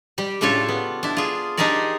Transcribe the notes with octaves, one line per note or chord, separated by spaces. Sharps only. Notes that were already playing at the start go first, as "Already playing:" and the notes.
G3 G4
A2 C#3 D4 F4 A4 C#5
B3
D4 E4
F4 G#4
D4 D#4 G4 G#4 A#4 D5